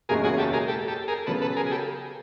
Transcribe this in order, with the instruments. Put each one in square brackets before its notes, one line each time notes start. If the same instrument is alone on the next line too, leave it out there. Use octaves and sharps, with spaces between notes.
[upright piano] F#1 E2 B2 G#3 C#4 [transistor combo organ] G#4 A#4
[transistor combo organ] F#4 G#4
G4 A4
G#4 A#4
G4 A4
G4 A4
G#4 A#4
[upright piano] C#3 F#3 B3 [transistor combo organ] A4 B4
[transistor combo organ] A4 B4
G#4 A#4
G#4
G4 A4